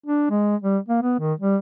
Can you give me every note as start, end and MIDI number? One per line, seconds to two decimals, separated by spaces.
0.06 0.28 62
0.30 0.56 56
0.62 0.78 55
0.88 1.01 58
1.02 1.15 59
1.20 1.34 51
1.40 1.57 55